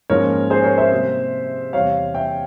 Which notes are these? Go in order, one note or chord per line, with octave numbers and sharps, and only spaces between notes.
G#2 F3 A#3 C#4 A#4 C#5
G#4 C5
A#4 C#5
C5 E5
C3 G3 A#3
E2 C3 G3 C#5 F5
E5 G5